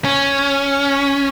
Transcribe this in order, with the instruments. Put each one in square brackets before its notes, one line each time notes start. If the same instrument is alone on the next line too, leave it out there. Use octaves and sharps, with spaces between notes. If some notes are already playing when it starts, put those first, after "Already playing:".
[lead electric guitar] C#4